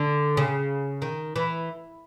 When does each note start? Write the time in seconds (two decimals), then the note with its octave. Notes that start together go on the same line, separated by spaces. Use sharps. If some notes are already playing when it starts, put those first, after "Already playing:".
Already playing: D3
0.37 C#3
1.02 D#3
1.36 E3